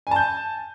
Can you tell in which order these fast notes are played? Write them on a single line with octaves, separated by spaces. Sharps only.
G#5 A5 G6